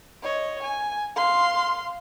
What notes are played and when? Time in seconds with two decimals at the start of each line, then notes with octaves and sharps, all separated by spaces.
0.22 C#5 D#5
0.63 G#5
1.16 F5 C6